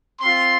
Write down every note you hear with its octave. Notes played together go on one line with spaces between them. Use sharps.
C4 F4 C6